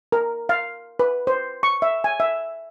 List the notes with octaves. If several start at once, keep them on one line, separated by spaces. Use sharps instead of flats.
A#4
F5
B4
C5
C#6
E5
G#5
E5